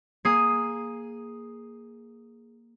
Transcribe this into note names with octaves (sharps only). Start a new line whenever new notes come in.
A#3 G#4 D#6 C7